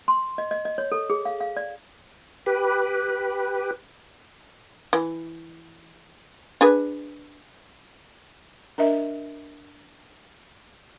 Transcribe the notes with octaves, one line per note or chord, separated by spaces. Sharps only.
C6
D#5
D#5
D#5
C#5
A4
G#4
F5
F5
D5
G4 B4
E3
D4 G#4 B4
D4 A#4 D#5 E5